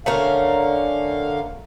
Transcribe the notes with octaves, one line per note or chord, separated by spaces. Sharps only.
D3 A3 C#4 A#4 F5